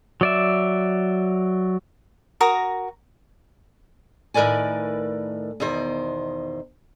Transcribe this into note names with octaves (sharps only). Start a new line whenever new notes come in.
F#3 D5 E5
F#4 A#4 A#5 D#6
A2 D#3 A#4 B4 D5 G#5
E2 B2 D#3 C5